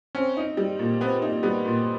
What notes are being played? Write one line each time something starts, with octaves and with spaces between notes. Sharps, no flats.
C4 C#4
D#4
G3
A#2
B3 C4
D#4
G3 B3
A#2